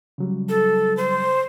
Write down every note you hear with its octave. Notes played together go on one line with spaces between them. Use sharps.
C#3 F#3 G3
A4
C5